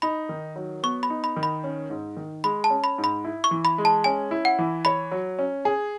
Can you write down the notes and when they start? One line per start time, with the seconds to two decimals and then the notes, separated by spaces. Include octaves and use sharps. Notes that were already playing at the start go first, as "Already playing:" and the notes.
0.02 D#4 B5
0.29 D#3
0.56 F#3
0.83 B3 C#6
1.03 B5
1.10 D#4
1.24 B5
1.36 D#3
1.43 B5
1.64 C#4
1.90 G#2
2.17 D#3
2.44 G#3 B5
2.64 A5
2.70 C#4
2.84 B5
2.98 G#2
3.04 B5
3.24 E4
3.44 C#6
3.51 E3
3.65 B5
3.78 G#3
3.85 A5
4.04 C#4 G#5
4.31 E4
4.45 F#5
4.59 E3
4.85 C#5 B5
5.12 F#3
5.39 C#4
5.65 G#4